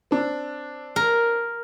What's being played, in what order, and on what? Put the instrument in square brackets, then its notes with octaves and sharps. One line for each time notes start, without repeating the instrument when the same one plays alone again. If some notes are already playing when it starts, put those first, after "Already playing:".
[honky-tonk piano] C4 D4
[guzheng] A#4